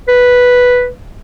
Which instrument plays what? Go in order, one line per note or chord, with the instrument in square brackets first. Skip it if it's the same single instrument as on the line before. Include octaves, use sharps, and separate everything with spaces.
[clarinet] B4